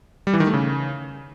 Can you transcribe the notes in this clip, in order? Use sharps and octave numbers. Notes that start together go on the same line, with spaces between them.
G3
E3
D#3
A3
C#3